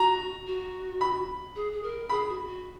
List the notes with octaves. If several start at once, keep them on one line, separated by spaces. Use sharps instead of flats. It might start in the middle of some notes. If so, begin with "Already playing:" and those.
Already playing: F#4 A#5
F#4
B5
G#4
G#4
A#4
G#4 B5
F#4
F#4